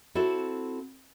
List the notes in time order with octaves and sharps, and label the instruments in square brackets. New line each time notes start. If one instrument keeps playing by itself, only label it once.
[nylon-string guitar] C4 E4 F#4 A4